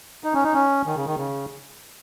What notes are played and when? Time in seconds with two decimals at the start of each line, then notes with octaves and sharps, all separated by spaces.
0.24 D#4
0.34 C#4
0.43 D#4
0.54 C#4
0.86 D#3
0.96 C#3
1.06 D#3
1.17 C#3